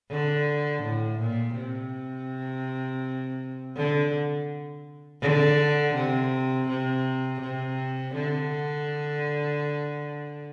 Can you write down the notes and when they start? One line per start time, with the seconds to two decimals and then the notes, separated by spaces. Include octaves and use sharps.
0.10 D3
0.83 A2
1.20 A#2
1.56 C3
3.76 D3
5.21 D3
5.95 C3
6.68 C3
7.41 C3
8.15 D3